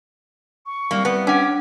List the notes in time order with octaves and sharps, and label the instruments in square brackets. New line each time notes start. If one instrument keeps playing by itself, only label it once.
[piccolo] C#6
[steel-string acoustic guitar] G3 C4 E4 [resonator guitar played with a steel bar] A#3
[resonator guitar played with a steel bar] B3
[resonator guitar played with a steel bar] C#4 [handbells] D4 F#5 [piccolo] D6